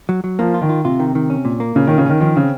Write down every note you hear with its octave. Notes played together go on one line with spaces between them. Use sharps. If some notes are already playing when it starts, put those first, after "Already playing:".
F#3
F#3
F3 A#3
F4
D#3
F4
C3 F4
D#3
D#3
C#4
A#2
A#3
A#2 C#3
D#3
C#4
C#3
D#3 C#4
D#3 F3
C#3 C4